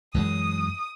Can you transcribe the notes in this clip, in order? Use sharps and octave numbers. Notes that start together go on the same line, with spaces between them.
F#2 E3 G#3 D#6